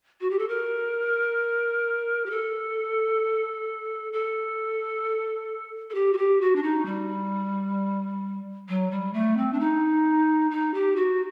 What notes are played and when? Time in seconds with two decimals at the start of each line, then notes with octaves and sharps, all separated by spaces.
0.21 F#4
0.30 G4
0.39 A4
0.49 A#4
2.26 G4
2.30 A4
4.13 A4
5.90 A4
5.95 G4
6.13 F#4
6.18 G4
6.41 F#4
6.56 D4
6.63 D#4
6.86 G3
8.69 F#3
8.91 G3
9.14 A3
9.37 C4
9.53 D4
9.60 D#4
10.51 D#4
10.74 G4
10.96 F#4